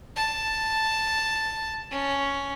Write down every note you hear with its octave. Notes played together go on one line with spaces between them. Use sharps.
A5
C#4